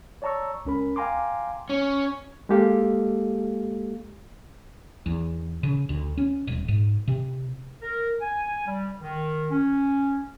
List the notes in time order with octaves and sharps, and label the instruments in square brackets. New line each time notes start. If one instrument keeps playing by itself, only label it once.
[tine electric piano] C#5 D5 A5 A#5 C#6 E6
C#2 C#4 A#4 B5
F5 G5 G#5 A#5 C6 D6
[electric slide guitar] C#4
[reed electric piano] G#3 A#3 G4 A4 F5
[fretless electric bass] E2
C#3
D2
C#4
D#1
G#2
C3
[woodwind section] A#4
G#5
G3
D#3
C#4